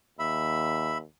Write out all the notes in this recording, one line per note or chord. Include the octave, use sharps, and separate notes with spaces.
D#2 E5 B5